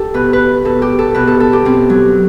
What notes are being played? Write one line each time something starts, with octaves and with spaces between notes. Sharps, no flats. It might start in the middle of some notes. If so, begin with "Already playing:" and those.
Already playing: G4 A4
B2 B4
B4
B2 A4
G4
A4
B2 B4
A4
A4
G4
B2 C4
F#3